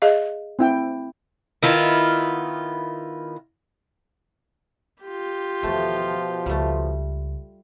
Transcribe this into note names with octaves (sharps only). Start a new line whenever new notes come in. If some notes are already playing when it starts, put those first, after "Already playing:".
G#4 D#5 F5
C4 E4 G5
D#3 B3 E4 F4
F4 G4
E2 B2 D#3 F3 A3
C#2 G3 A3